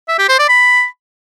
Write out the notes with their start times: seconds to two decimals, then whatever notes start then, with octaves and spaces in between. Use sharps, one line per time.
0.08 E5
0.18 G4
0.28 C5
0.39 D5
0.49 B5